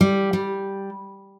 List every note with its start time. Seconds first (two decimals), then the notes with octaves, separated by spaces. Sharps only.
0.01 G3
0.33 G3